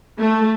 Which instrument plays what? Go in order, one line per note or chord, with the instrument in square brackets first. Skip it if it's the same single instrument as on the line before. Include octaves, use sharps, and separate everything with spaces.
[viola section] A3